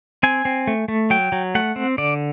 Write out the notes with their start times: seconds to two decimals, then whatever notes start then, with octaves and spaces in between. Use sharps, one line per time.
0.23 C4 G#5
0.45 C4
0.67 A3
0.88 A3
1.10 F#3 G5
1.32 F#3
1.55 A3 F#5
1.76 C4
1.98 D3 D5